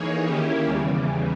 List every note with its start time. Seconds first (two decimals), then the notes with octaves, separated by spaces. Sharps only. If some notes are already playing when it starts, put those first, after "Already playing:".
Already playing: E3 A#3 D#4 G#4 C#5
0.25 D#3 A#3 C#4 E4 G4
0.65 E2 C#3 E3 G3